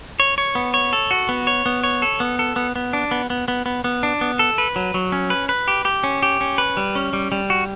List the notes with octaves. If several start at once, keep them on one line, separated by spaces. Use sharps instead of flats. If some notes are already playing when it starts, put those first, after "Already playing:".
C#5
C#5
B3
C#5
A4
F#4
B3
C#5
B3
C#5
A4
B3
A4
B3
B3
D4
B3
B3
B3
B3
B3
D4
B3
A4
B4
F#3
F#3
C#4
B4
B4
G4
G4
C#4
G4
C#4
B4
G3
C#4
G3
G3
F#4